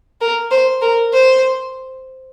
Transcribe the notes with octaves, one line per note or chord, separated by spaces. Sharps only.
A#4
C5
A#4
C5